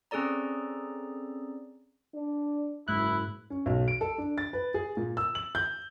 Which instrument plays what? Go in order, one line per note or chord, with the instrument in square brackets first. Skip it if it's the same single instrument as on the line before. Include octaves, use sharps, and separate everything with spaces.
[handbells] C4 C#4 G#4 A4 D5 A#5
[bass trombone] D4
[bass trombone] F#1 [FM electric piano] G#2 F#6 [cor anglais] E4
[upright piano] C#4
B1
D7
A4
D4
A6
B4
G#4
A#2
E6
F#7
G6